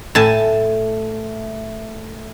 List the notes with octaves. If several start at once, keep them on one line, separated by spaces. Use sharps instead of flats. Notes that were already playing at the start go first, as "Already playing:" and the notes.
A2 A3 G#5 A5